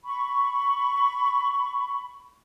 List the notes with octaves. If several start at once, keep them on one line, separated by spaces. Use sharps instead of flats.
B5 C#6